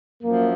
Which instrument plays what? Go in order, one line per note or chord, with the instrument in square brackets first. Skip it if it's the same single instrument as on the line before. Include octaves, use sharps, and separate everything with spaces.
[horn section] F#2 F3 [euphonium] A#3